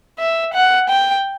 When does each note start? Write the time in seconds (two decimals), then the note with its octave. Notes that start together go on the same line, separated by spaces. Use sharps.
0.19 E5
0.54 F#5
0.89 G5